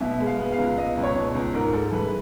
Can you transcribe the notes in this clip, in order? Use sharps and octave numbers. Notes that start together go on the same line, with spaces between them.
B2 E5
G#3
F5
B3
F5
C#2
B3 D#5
C#2
C#5
B2
C#2
G#2 A#4
G#3 A4
E3 B4